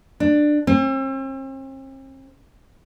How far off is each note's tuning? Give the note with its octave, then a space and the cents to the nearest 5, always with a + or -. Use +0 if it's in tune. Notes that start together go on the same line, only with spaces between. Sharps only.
D4 +15
C4 +45